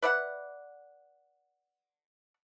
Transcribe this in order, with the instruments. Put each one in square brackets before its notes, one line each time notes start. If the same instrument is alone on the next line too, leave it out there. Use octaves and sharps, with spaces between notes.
[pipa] B4 D5 E5 F#5